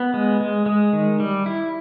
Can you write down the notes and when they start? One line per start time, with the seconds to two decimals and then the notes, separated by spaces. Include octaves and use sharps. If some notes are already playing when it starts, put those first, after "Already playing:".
Already playing: B3
0.14 G#3
0.41 G#3
0.66 G#3
0.93 D#3
1.20 G3
1.46 E4